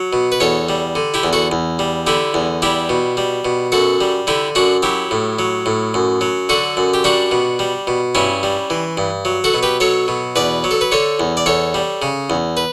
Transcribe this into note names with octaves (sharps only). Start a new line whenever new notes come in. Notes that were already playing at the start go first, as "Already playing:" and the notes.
Already playing: F#3
B2
B4
E2 A4 C#5
G3
D3
E4 G4
E2
F#4 A4
E2
G3
D3 E4 G4
E2
G3 E4 G4
B2
G3
B2
F#2 F#4 A4
G3
D3 E4 G4
F#2 D4 F#4
F#3 E4 G4
A2
F#3
A2
F#2
F#3
D3 F#4 A4
F#2
G4
G3 D4 F#4
B2
G3
B2
G2 C#4 E4
G3
E3
G2
F#3
F#4 A4
B2
G4 B4
F#3 A4 C#5
B2
E2 B4 D5
F#3
A4
B4
D3 A4 C#5
E2
D5
E2 A4 C#5
G3
C#3
E2
B4